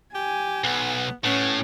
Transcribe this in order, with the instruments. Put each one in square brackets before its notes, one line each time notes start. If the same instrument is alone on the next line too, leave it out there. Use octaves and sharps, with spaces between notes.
[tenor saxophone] G4 [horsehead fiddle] G#5
[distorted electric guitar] B1 [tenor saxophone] B3
[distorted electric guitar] A2 [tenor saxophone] B3 [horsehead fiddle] C#4